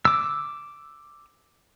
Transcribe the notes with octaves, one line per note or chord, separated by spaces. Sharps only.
D6 E6